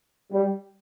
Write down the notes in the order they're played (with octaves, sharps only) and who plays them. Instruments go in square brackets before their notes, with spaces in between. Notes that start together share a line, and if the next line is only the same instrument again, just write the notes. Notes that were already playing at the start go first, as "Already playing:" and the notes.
[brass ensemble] G3